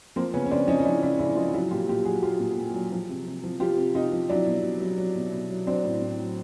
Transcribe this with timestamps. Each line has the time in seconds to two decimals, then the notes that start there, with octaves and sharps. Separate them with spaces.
0.16 F3 A#3 C4
0.34 C#3 B3 C#4
0.46 C#4
0.51 C#3 C4 D4
0.68 F3 C#4 D#4
0.79 D#4
0.85 F3 D4 E4
1.02 C#3 D4 E4
1.19 C#3 D4 E4
1.36 F3 D#4 F4
1.54 F#3 E4 F#4
1.71 A#2 F4 G4
1.89 A#2 F4 G4
2.05 F#3 F#4 G#4
2.22 F#3 F4 G4
2.40 A#2
2.57 A#2
2.74 F#3
2.92 F3
3.09 C3
3.26 C3
3.44 F3
3.60 F3 F4 G4
3.77 C3
3.94 C3 D#4 F4
4.12 F3
4.29 F#3 D4 E4
4.47 B2
4.63 B2
4.80 F#3
4.98 F#3
5.15 B2
5.32 B2
5.50 F#3
5.66 F#3 C4 D4
5.84 A2
6.01 A2
6.18 F#3